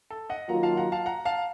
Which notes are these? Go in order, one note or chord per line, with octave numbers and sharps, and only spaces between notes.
A4
D#5 F#5
D#3 F#3 A#3 F4 F#5 A#5
F5 A5
F#5 A#5
F5 A5
F#5 A#5
F5 A5